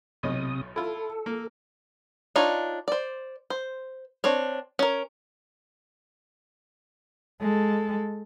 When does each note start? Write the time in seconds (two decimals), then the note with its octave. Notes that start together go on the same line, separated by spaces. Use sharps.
0.23 B1 A2 C3 D#5 D#6
0.76 E4 F4 A4
1.26 A#3
2.36 D4 D#4 F4 C#5
2.88 C5 D5
3.50 C5
4.24 C4 D4 C#5
4.79 C#4 A#4
7.41 G#3 A4